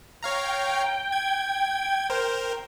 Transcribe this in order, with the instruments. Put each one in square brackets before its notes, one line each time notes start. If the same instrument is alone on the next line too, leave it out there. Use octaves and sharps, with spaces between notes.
[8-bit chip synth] C#5 F5 A#5 [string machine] G5
[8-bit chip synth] G#6
A#4 C5